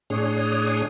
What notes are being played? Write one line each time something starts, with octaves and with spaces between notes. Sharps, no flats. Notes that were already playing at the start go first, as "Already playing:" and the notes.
A2 D4 G#4 C#5 D#6